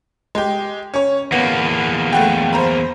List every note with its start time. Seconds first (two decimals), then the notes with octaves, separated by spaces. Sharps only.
0.35 G#3 G4
0.94 C#4 C#5
1.32 E2 A#3 B3
2.13 A3 F#5 G5
2.53 C5 A#5 B5